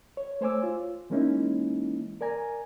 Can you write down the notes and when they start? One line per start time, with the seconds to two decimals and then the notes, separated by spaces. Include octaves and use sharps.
0.17 C#5
0.41 A3 C5 C#5 G#5 D6 E6
0.63 F4
1.10 E3 G#3 A#3 C#4 D#4 E4
2.21 A#4 D5 G#5 A#5